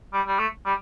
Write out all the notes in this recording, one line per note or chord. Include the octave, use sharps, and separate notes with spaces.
G3
G3
A3
G3